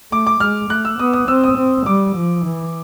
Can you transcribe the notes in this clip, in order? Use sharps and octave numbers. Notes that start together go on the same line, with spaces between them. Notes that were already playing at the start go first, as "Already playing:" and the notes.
A3 D6
D6
G#3 F6
A3 F#6
E6
B3 D#6
D#6
C4 E6
D#6
C4
G3 D6
F3
E3